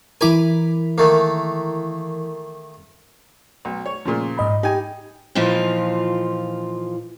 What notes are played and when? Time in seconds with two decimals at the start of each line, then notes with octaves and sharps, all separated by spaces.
0.21 E3 E4 A#4 G#5 B5 D6
0.98 D#3 A3 A#3
3.65 B1
3.86 C#5
4.05 A#2 C#3 F3
4.37 G#2 D#5 B5
4.63 D#4 G4 G5 G#5
5.35 A#2 E3 F3 D#4 F4